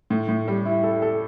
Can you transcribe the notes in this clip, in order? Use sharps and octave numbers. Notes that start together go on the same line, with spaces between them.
A2
A2
G3
E4
A4
A4